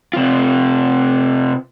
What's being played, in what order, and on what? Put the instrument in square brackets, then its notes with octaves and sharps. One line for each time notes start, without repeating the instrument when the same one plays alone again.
[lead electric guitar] C3 F4